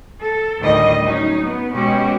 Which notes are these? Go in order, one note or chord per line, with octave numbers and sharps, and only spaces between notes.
A4
D2 A2 D#3 G3 D#5
F#3 C#4 D#4
B3
B2 G#3 C#4 F#4 G4